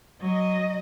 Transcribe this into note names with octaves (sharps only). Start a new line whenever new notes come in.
F#3 D#5